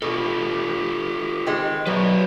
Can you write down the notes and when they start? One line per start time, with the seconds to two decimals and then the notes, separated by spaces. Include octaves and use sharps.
0.02 B2 F4 G4 A4
1.46 D#3 G#3 C4
1.86 B2 F#3 B4 C#5 D5